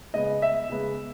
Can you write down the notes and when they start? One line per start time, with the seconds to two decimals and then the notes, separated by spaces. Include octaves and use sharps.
0.14 C#3 G#3 B3 D#5
0.42 E5
0.70 C#3 G#3 B3